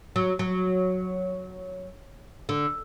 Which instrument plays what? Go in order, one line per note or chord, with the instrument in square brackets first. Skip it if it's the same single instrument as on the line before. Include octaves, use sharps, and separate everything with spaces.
[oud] F#3
F#3
D3